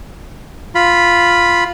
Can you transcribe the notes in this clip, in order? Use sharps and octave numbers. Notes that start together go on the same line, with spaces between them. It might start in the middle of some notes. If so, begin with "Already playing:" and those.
F4 B5